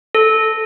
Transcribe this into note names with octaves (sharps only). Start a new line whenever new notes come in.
A4